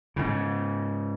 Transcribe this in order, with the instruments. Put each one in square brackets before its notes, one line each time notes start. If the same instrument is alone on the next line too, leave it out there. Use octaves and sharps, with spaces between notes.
[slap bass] G#2 C#3